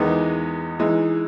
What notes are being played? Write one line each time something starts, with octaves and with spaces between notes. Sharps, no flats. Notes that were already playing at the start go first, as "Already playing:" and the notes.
Already playing: E2 D#3 G#3 B3 D#4
E3 G#3 D#4